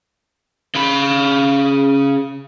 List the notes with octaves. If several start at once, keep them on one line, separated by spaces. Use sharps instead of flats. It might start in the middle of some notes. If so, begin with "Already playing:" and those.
C#3 B5